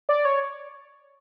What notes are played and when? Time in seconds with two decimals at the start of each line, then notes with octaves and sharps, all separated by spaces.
0.09 D5
0.25 C#5